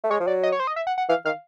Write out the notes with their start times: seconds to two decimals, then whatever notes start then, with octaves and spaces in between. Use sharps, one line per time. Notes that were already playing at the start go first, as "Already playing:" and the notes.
0.04 A3
0.11 G#3 C#5
0.20 F3
0.27 F#3 D5
0.43 D#5
0.52 C#5
0.60 C5
0.67 D#5
0.76 E5
0.87 F#5
0.98 F#5
1.09 E3 F5
1.25 D#3 F5